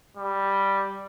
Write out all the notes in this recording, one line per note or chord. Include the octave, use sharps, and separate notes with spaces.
G3